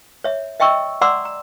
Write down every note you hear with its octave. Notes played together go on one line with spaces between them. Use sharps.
C#5 E5
D#5 E5 G5 C#6 E6
D5 F#5 A#5 C6 D6 E6
A#5